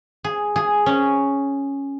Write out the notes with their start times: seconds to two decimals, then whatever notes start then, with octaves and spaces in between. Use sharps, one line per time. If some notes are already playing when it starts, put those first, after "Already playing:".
0.24 G#4
0.56 G#4
0.86 C#4